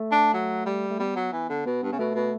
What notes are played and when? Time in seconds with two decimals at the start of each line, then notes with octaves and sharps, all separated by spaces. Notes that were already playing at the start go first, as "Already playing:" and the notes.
Already playing: A3
0.12 D4
0.33 F#3
0.66 G3
0.91 A3
0.99 G3 B3
1.16 F#3
1.32 E3 B3
1.49 D3
1.66 B2 B3
1.83 G2
1.92 C#3
1.99 B2 A3
2.15 B2